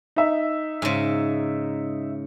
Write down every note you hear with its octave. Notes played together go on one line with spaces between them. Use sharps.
D#4 E5
G#2 C#3